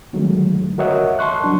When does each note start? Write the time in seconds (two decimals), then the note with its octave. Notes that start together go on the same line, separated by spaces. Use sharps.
0.13 D3 D#3 F#3 G#3 A3
0.78 F#4 A#4 C#5 D#5 E5 F#5
1.19 A5 C6 C#6 F#6
1.44 F#3 D4